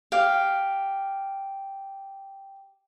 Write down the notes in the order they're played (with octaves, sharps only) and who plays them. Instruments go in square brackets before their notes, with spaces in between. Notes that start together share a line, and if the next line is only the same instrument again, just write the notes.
[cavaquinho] G4 F5